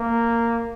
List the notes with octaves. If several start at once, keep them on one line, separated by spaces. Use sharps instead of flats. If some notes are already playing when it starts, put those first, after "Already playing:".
Already playing: A#3